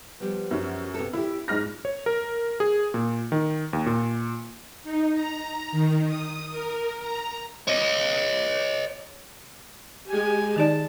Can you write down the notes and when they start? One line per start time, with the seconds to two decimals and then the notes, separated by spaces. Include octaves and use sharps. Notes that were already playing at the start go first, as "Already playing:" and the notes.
0.20 F3 G3 B3
0.51 F#2 C#4
0.95 C3 B3 A4
1.13 D4 E4 G4
1.48 G#2 F4 F6 A#6
1.85 C#5
2.06 A#4
2.60 G#4
2.94 A#2
3.32 D#3
3.73 D#2
3.86 A#2
4.84 D#4
5.15 A#5
5.72 D#3
6.07 D#6
6.51 A#4
6.99 A#5
7.67 C#5 D#5
10.10 G#3 G4 G#5
10.56 D#3 D#4 D5 A5